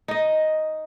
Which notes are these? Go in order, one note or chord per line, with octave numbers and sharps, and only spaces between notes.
D#4 D#5